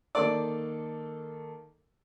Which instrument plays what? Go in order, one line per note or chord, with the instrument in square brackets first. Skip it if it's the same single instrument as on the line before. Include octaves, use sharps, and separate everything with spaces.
[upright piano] D#3 A#3 A4 [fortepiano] D5